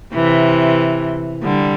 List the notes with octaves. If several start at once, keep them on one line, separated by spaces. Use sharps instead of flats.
C3 E3
D3 G3